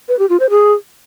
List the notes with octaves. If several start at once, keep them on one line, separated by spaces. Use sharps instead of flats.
B4
G4
F4
C5
G#4